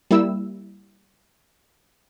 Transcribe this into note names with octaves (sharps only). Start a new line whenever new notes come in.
G3 A#3 E4 E6